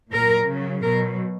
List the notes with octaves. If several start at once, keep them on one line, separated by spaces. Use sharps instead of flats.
A#2 F#3 A#4
C#3 F#3
B2 F#3 A#4